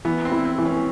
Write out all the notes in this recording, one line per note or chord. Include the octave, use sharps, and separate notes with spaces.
E3 B3
C4
E4
C4
E3
C#4